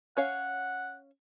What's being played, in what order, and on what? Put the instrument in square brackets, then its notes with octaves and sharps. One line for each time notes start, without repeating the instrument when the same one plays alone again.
[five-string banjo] C#4 C#5 F5 [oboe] F#5